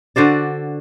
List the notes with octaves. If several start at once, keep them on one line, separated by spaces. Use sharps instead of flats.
D3 F#4 C5 D5